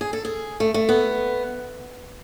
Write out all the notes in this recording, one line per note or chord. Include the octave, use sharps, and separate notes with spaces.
G#4
A4
G#4
A3
A3
B3